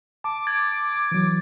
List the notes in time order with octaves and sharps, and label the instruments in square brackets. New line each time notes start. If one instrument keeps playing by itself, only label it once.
[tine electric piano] A5 [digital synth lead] D6
[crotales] G#6 A6
[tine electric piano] E3 F#3